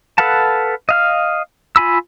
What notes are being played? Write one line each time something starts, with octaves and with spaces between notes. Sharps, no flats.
A4 B4 F5 F#5 A5
D#5 F5 F6
F4 G#5 B5 E6